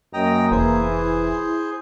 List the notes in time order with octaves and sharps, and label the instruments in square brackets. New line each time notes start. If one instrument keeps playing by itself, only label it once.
[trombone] F#2 [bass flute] A#3 [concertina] D#5 G5 A#5
[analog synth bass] F1 [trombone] E3 [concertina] G#4 C5
[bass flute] E4